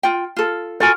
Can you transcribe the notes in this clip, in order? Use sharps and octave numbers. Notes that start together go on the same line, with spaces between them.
F4 G5
F4 A4
F4 F#4 A4 A#4 G#5